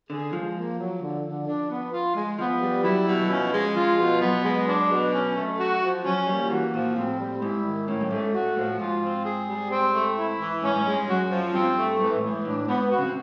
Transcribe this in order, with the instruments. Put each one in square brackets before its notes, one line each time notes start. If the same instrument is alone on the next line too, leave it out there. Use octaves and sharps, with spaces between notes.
[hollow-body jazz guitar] D3 [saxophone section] G#4
[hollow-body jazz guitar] F3 [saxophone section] G#3
[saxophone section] A#3
F#3
D3
D3
D4
B3
F4
G#3
[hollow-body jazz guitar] F3 [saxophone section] B3
[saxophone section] G3
[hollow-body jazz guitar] F#3 [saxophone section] E4
[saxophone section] B2
[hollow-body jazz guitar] F#3
[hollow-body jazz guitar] F3 [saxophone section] C#4
[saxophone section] G#3
[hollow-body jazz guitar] F3 [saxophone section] F4
[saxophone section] B2
[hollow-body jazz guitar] F#3 [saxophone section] B3
[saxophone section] G#3
D4
B2
C#4
A3
F#4
F3
[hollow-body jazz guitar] F#3 [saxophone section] C#4
[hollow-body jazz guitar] G3 [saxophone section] A#3
[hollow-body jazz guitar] F3
[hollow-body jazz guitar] E3 [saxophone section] F#4
[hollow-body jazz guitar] A#2 [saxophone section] F3
[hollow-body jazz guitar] A2 [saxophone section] C4
[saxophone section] G3
[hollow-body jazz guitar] G#2 [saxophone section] E4
[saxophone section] D#3
[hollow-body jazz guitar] A2 [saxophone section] C#4
[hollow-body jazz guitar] G2
[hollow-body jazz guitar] G#2 [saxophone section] A3
[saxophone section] F#4
[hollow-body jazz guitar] A2 [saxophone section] F3
[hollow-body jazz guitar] G#2 [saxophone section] F4
[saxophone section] C4
G#4
G3
C4
A3
E4
E3
[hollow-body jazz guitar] G#2 [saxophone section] C#4
[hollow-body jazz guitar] G#2
[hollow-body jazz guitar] G2 [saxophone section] G#3
[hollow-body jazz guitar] F#2 [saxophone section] F#4
[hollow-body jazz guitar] F#2 [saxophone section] F3
[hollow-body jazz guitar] G2 [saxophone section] C4
[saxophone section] A3
[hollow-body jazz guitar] G#2 [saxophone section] E3
[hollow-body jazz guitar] A2
[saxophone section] E3
[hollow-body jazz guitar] G#2
[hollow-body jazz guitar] A2 [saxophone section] D4
[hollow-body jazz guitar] G#2 [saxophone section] B3
[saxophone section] F#4
[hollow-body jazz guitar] C#3
C3